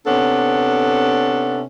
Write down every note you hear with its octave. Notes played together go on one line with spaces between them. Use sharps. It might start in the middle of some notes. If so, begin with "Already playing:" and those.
C3 B3 C#4 D4 A4